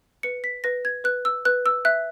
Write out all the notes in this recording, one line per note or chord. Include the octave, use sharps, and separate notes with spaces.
B4 C#7
B6
B4 A#6
G#6
B4 F#6
E6
B4 F#6
E6
E5 F#6